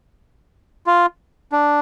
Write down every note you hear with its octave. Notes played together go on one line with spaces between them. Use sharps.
F4
D4